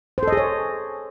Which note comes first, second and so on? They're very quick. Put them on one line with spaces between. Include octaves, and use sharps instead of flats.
C5 A4 D#5 G#4 C#5